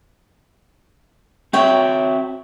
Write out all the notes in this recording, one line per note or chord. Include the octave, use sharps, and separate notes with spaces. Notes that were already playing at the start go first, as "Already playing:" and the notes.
C4 F#4 C#5 E5 G5